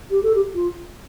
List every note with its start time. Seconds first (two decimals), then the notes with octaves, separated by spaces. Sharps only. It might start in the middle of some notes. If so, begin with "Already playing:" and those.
0.11 G4
0.23 A4
0.35 G4
0.55 F4